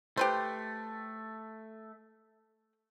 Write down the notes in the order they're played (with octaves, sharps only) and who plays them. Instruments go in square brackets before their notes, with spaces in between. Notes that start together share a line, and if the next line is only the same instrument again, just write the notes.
[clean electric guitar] A3 [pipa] G4 B4 C5